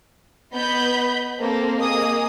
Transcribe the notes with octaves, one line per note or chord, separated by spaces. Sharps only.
B3 B4 D#5 B5 G6
A#3 C4 A4 C5
A#3 G#4 D#5 D#6